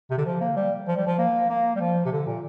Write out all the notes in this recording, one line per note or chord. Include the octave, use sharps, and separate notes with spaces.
C3
D3
F3
A#3
G3
F3
G3
F3
A#3
A#3
G3
F3
C3
D3
A#2